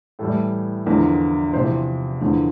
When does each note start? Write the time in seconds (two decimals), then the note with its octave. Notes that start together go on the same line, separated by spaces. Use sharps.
0.19 A2 E3 G3 A4
0.86 E2 D3 F3 A#4
1.53 E2 C3 F3 C5
2.21 E2 D3 F3